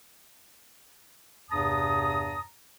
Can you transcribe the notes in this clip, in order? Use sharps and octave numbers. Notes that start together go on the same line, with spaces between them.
E2 G2 C3 A5 A#5 D#6